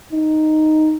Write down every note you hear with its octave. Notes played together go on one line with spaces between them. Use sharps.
D#4